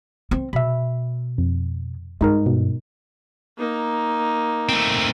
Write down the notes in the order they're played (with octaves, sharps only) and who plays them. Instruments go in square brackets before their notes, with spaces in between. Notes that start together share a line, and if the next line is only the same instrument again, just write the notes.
[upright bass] C4
[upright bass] B2 [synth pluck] E5 B5
[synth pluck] F2
[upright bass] G2 [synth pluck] G#3 D#4 A#4
[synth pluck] B2
[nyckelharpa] A#3 D#4
[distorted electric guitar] A3 C4